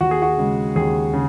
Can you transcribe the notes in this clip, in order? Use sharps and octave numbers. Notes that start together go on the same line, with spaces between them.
D#2 F#4
G#4
F#4
C#3 G#3
D#2 G#4
C#3